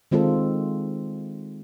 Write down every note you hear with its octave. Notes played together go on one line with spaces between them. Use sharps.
D#3 G#3 C4 F4 A4